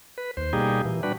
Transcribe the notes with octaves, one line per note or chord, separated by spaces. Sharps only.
B4
D#2 C5
B2 G3 A#3 D#4 G4 G#4
A#2 E3
G3 D4 F#4 B4